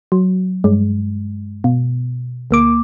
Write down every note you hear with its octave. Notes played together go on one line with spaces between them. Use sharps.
F#3
G2 G#3
B2
D2 A#3 D6